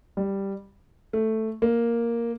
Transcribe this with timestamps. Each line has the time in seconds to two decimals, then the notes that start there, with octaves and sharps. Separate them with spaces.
0.17 G3
1.13 A3
1.62 A#3